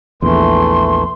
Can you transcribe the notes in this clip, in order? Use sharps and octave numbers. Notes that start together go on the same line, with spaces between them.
A#1 E2 E3 A3 C6